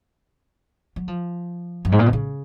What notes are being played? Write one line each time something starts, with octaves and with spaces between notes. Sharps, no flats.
F#3
F3
F#2
G#2
A#2
B2
C#3